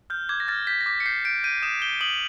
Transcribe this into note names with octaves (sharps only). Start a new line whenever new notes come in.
F6 G6
D6 G#6
A#6
F6 A6
G6 B6
A#6
D6 B6
C#7
G6 C7
G6 D7
G6 D#7
D#6 E7
G6 G7
D#6 F#7